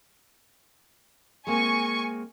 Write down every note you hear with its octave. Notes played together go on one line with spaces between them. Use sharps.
G#3 A#3 C4 G#5 C#6